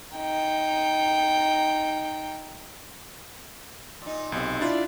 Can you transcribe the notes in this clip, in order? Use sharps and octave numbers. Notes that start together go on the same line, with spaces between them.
D#4 G5
A#2 D#4
B1 C3
D4 E4 F4 D5